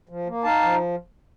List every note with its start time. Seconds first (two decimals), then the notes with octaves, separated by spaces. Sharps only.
0.09 F3
0.27 A#3
0.44 D#4 F5 A5
0.62 F3